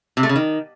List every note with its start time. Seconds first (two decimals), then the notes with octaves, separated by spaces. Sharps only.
0.17 C3
0.23 A3
0.29 C#3
0.36 D#3